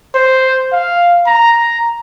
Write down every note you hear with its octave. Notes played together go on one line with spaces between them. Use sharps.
C5
F5
A#5